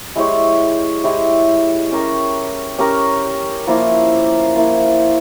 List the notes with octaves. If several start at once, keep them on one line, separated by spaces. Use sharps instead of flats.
G#3 E4 G4 C#5
G#3 E4 G4 C#5
C#4 G4 A#4
C#4 G4 A#4
F3 A#3 E4
F3 A#3 E4